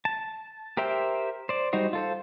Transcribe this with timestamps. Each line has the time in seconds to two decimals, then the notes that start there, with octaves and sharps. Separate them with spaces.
0.05 A5
0.77 G4 A#4 C5 E5 G5
1.49 C5 D5
1.73 G3 D#4 F#4 C5
1.93 F4 A4 C5